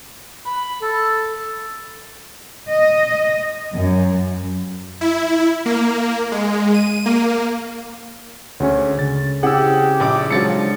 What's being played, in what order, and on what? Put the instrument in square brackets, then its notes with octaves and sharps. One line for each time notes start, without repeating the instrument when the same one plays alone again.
[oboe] B5
A4
[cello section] D#5
F#2
[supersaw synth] E4
A#3
G#3
D#7
A#3
[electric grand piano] D2 C#4 [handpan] G#4 C#5
[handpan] C#3 [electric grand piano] A6
[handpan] C4 C#4 E4 [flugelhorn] G4 [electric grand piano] G#4 E6 [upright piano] F#5
[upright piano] A#1 D4 D6
[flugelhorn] F3 [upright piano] F#3 A6 C#7 [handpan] G#3 C#4 D4